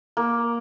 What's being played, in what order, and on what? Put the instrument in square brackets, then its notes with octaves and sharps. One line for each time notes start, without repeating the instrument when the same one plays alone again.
[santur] A#3